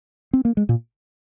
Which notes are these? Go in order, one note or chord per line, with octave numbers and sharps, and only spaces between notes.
C4
A#3
G#3
A#2